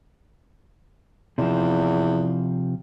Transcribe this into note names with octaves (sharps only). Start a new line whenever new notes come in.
E2 C3 F3